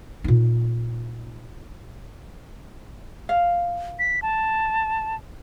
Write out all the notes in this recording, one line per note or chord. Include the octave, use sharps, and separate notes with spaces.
A#2 D#4
F5
B6
A5